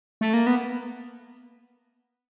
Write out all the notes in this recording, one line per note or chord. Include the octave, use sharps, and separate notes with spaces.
A3
A#3
B3